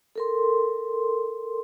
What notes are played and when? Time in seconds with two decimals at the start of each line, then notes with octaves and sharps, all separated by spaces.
0.16 A4 A#4 C6